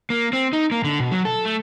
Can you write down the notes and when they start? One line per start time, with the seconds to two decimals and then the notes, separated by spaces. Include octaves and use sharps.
0.10 A#3
0.33 C4
0.53 D#4
0.72 A#3
0.84 D3
1.00 B2
1.11 F#3
1.25 A4
1.45 A3